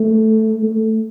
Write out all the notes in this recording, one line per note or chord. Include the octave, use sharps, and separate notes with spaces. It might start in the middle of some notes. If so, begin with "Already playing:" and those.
Already playing: A3
A3